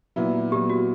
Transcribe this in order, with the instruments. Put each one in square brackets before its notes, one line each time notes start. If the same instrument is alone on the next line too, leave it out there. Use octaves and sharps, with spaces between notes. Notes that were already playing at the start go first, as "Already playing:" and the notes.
[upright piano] A#2 F#3 B3 E4
[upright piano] A#2 F#3 B3 E4 [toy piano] G4
[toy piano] F#4